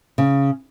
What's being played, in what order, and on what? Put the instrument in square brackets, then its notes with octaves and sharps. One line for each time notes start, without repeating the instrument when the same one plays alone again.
[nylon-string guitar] C#3